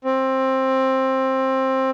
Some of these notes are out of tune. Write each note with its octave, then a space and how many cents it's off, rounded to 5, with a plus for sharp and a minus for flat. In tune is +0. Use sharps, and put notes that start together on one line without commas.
C4 +15